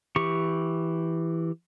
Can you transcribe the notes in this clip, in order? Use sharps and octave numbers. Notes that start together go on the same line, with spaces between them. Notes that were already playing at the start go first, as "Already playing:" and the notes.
E3 G4 C#6